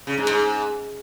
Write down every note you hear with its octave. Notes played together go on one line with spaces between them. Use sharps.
C#3
G#2
G#2